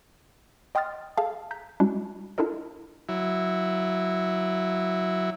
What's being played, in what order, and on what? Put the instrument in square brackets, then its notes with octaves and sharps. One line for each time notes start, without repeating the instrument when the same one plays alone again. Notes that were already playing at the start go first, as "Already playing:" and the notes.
[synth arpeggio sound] D#5 G5 C6 D#6 F6 A6
G#4 A4 E5 F5 A5
A#5 G6 B6
G3 G#3 C#4 D4 E4 F#4
D4 E4 F4 A4 A#4 D#5
[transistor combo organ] F#3 E4